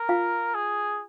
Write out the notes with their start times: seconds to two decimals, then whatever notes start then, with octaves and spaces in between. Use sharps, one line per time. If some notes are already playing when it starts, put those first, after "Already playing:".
Already playing: A#4
0.09 F4 F5
0.55 G#4